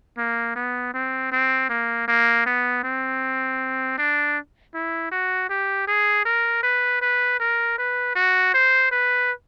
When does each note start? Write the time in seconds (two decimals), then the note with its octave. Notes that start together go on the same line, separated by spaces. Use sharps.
0.18 A#3
0.56 B3
0.94 C4
1.32 C4
1.70 A#3
2.08 A#3
2.46 B3
2.84 C4
3.98 D4
4.74 E4
5.12 F#4
5.50 G4
5.88 G#4
6.25 A#4
6.63 B4
7.02 B4
7.40 A#4
7.78 B4
8.16 F#4
8.54 C5
8.92 B4